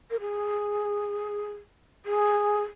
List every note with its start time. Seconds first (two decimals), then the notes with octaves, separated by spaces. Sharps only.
0.10 A#4
0.19 G#4
2.05 G#4